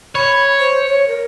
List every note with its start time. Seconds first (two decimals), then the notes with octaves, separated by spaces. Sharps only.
0.15 C#5 B5
0.60 C5
0.87 C#5
1.08 A#4